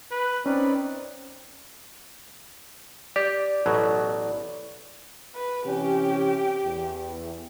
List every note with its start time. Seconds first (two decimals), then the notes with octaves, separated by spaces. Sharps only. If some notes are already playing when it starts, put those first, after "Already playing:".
0.11 B4
0.46 C4 C#4 D#4 B4 D5
3.16 G4 D5
3.66 A1 B2 F#3
5.36 B4
5.66 C3 E3 C#4 G4
6.64 E2